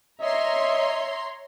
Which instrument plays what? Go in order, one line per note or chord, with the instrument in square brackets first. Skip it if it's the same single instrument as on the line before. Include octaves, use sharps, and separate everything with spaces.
[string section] C#5 A#5 C6 [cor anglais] D#5 [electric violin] E5